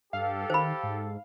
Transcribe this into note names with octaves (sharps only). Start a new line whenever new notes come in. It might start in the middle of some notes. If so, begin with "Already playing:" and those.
G2 G4 A4 F5
D#3 C5 B5
G#2